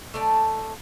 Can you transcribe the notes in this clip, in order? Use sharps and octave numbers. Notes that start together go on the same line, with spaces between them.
A3 D#4 D5 A5